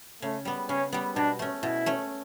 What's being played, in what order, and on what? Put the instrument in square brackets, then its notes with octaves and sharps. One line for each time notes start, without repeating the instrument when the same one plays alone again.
[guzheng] C#3 [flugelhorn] A3
[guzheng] G3 B3
[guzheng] C#3 [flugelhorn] C#4
[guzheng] G3 B3
[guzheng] B2 [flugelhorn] D4
[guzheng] A3 C#4
[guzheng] B2 [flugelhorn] E4
[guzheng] A3 C#4